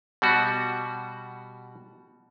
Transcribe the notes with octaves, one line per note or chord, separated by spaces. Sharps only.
B2 G3 F#4